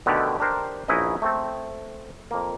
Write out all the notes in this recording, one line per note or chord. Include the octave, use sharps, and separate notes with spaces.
B2 D3 D#3 A3 G4 D5
D4 G4 A#4 C5
A#1 C#4 D#4 E4 B4 D#5
A3 C4 A4
F2 A#3